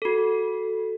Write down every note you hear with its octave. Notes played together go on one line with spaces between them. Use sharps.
F#4 A4